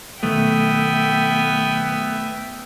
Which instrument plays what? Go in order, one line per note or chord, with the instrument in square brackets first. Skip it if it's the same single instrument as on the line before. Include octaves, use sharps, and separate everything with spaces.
[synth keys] B2 D#3 F#3 [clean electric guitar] A3 [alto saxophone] B3 [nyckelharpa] E5 G5